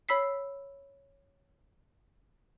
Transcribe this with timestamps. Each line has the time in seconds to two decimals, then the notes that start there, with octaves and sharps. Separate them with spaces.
0.09 C#5 B5 E6 B6 C7